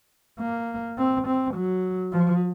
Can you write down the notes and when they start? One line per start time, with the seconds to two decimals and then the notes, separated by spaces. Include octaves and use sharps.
0.40 A#3
0.98 C4
1.27 C4
1.55 F#3
2.13 F3